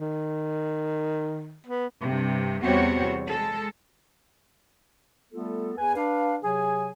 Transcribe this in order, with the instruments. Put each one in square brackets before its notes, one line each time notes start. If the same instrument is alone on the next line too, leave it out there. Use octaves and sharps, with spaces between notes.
[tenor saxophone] D#3
B3
[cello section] G2 C3
E2 C3 G3 C4 F#4 C#5
G#3 A4
[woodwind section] G3 A3 B3 F4 A4
E2 B4 G#5
D4 B4 F5
C3 F#3 G#4 G#5